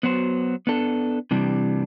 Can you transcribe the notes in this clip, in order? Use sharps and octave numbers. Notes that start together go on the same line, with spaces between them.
F#3 B3 F#4 C5
B3 D4 A4
C3 E3 G3 D4